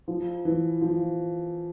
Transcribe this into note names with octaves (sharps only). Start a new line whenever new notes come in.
F3
E3
F3